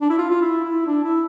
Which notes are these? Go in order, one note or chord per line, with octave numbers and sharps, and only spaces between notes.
D4
E4
F4
F4
E4
E4
D4
E4